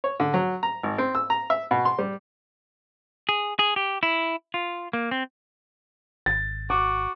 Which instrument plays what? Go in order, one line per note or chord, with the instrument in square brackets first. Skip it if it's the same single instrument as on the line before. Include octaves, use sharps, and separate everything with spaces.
[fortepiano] C#5
D3
F#3
A#5
G#1
C4
E6
A#5
E5
B2
C6
G3
[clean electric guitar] G#4
G#4
G4
E4
F4
A#3
C4
[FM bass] G#1 [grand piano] A6
[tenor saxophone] F#4 [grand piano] D6